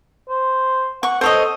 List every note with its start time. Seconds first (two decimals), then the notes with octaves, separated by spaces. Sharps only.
0.29 C5
1.03 F#5 C#6
1.21 A4 C5 C#5 D#5